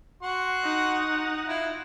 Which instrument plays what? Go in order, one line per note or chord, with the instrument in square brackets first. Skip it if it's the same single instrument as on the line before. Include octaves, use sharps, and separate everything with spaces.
[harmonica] F#4 C6
[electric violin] D#4 F#5
[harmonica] E4 F4